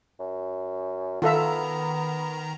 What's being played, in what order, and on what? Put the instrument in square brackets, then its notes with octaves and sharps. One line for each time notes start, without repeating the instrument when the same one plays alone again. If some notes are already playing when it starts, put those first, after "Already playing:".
[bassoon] F#2
[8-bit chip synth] D#3 A#5 [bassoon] B3 [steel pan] F4 A4 E5